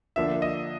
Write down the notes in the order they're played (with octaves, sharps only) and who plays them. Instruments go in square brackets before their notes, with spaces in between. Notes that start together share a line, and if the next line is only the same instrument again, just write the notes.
[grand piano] D3 F3 A#3 D4 E5
D#5